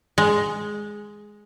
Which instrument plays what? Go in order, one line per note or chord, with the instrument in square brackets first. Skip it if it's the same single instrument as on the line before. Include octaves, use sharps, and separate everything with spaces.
[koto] G#3